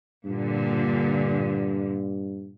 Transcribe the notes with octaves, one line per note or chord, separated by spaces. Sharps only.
G2 A#2 D3